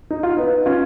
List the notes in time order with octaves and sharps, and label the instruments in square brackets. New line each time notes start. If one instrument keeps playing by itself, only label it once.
[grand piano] D#4
F4
B3 D#4
C#4 F4